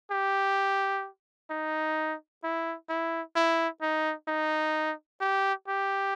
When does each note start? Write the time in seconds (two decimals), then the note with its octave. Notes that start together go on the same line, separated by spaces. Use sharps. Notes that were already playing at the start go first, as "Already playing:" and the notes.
0.11 G4
1.50 D#4
2.44 E4
2.89 E4
3.36 E4
3.82 D#4
4.28 D#4
5.21 G4
5.68 G4